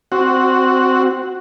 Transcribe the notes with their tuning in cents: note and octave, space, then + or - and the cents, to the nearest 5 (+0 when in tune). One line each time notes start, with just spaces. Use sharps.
C4 +0 F#4 +0